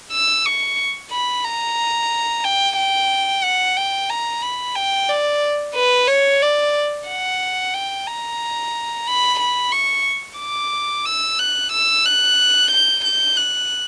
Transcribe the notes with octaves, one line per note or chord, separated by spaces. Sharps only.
E6
C#6
B5
A#5
G5
G5
F#5
G5
A#5
B5
G5
D5
B4
C#5
D5
F#5
G5
A#5
B5
B5
C#6
D6
E6
F#6
E6
F#6
G6
G6
F#6